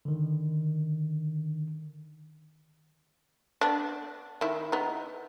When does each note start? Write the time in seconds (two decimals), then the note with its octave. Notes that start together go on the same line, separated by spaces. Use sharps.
0.05 D3 D#3
3.61 B3 D4
4.41 D#3 E4
4.72 B3 D#4